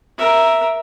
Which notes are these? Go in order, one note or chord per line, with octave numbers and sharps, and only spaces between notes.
A#4 E5